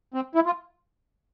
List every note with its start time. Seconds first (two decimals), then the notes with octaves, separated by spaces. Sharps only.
0.14 C4
0.35 E4
0.46 F4